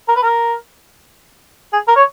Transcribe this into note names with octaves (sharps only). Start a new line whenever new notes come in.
A#4
B4
A#4
G#4
A#4
C#5